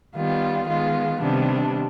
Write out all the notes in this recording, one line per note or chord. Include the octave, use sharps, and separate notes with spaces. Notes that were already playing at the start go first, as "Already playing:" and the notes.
D#3 G3 B3 F4
D#3 G#3 B3 F4
C3 D#3 G3 B3 D4